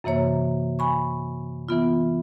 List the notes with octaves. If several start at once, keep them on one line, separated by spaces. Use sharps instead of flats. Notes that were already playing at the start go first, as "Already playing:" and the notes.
F#2 C3 E3 A#3 C#5
G#5 B5 C#6
E3 B3 F4